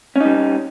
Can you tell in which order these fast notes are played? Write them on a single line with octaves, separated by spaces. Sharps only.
C#4 D#4 G3